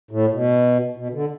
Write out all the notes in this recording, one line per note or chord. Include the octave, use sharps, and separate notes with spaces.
A2
B2
B2
D3